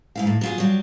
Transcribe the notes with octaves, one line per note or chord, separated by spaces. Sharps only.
G#2 E4 F5
A2
F#3 F4 G#4
F#3 G3